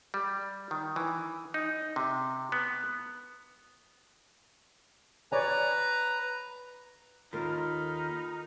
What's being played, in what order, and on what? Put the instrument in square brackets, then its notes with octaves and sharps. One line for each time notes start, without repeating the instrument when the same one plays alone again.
[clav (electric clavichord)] G3
D#3
E3
D#4
C3
B3
[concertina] B4 A#5 [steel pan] C#5 D5 G#5
[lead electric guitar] D#2 [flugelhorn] D#4 [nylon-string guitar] F4 A4 A#4 [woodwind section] B5 F6